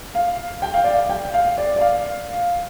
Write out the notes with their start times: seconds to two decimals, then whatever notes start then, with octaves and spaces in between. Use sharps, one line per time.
0.15 F5
0.62 G5
0.74 F5
0.84 D5
0.94 F5
1.10 G5
1.34 F5
1.58 D5
1.76 D5
1.81 F5